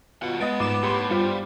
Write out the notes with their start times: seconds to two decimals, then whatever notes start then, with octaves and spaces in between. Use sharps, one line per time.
0.22 D#2 B2 F4 F#5
0.40 G#3 B3 D#5 A6 D7
0.60 G#2 A#3 F4 D6 E7
0.83 A2 G4 B5 C6
1.10 G2 G3 F4 C5